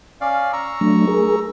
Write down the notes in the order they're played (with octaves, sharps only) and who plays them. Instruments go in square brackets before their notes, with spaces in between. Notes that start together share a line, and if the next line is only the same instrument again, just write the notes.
[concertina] C#4 D5 F5
A#5 C#6 E6
[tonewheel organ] F#3 A3 D4
G#4 A#4